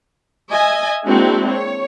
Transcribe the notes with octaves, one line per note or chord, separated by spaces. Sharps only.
D#5 E5 G#5
G#3 A#3 C4 D4 E4 F#4
C#5